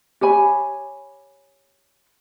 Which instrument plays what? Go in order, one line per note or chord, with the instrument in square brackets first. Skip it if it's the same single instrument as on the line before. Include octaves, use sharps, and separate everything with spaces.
[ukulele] G4 C#5 G#5 B5